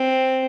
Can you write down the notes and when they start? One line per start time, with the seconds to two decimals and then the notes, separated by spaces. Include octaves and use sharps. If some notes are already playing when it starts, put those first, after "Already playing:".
Already playing: C4